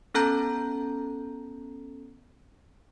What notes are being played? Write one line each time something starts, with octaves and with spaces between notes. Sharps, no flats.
B3 C#4 A4 A5 A#5 G6